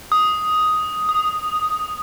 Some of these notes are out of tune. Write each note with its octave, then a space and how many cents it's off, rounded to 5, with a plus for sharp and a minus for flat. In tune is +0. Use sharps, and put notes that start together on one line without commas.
D#6 +5
D#6 -10